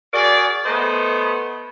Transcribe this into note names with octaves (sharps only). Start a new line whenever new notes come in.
F#4 G#4 A#4 D5
A3 B3 C5 D#5